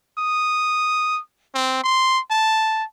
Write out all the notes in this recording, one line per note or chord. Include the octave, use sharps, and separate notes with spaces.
D#6
C4
C6
A5